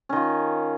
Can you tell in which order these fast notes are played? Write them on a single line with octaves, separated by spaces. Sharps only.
C#4 D#3 F4